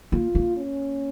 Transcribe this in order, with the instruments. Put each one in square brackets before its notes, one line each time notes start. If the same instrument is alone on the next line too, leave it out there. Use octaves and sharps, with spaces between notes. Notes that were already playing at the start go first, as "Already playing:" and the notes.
[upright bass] A#3 [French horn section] F4
[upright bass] A#3
[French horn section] C#4